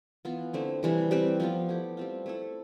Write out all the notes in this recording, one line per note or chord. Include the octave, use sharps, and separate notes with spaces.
E3 B3 F4
D3 A3 C4 E4
C3 E3 G3
G3 C4 G4 B4
F3 B3 F4
A3 E4 G4
G3 C4 F4
A3 E4 A4